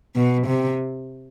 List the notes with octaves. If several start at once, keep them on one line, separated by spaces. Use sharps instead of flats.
B2
C3